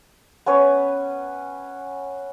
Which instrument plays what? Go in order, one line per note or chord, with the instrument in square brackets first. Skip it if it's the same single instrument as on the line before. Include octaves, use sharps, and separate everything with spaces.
[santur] B3 C#4 B4 C#5